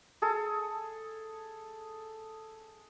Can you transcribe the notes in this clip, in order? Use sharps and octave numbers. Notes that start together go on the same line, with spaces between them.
G#4 A4